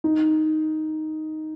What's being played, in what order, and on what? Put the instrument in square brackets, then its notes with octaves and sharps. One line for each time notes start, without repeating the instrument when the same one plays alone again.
[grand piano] D#4